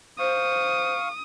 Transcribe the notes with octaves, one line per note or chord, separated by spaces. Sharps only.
C5 F5 C#6 D#6